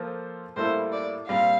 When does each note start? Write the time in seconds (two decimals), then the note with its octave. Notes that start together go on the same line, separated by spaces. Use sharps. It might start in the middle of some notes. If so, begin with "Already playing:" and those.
Already playing: F3 A#3 F4 A4 C5
0.56 A2 G3 A#3 E4 A4 C5
0.93 D5
1.28 A#2 G3 C4 F5